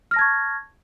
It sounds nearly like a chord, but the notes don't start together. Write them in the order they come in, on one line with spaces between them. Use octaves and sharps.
F6 A#6 A5 G#6 C#6